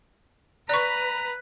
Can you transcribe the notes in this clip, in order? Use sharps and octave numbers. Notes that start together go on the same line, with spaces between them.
B4 D5 A#5 C#6 F#6